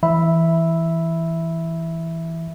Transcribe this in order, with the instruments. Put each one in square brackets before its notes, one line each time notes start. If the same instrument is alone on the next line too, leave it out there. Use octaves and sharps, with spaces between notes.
[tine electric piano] E3 E5 B5